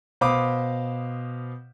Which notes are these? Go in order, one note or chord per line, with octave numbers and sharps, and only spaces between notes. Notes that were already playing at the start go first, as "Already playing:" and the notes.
B2 C5 F5 B5 D6 D#6